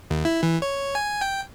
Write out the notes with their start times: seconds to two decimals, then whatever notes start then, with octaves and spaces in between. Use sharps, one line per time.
0.11 D#2
0.25 E4
0.43 E3
0.62 C#5
0.95 G#5
1.21 G5